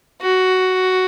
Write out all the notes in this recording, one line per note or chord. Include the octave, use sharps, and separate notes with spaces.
F#4